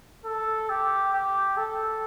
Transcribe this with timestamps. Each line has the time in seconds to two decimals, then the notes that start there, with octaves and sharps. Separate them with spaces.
0.25 A4
0.69 G4
1.13 G4
1.57 A4